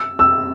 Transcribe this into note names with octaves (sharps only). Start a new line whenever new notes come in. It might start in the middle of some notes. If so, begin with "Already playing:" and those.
Already playing: E6
E6